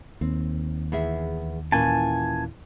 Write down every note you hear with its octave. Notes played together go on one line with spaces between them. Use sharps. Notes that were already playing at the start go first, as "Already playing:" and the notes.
D#2 C4
E2 G#4 E5
A#2 E3 C#4 G#5 A5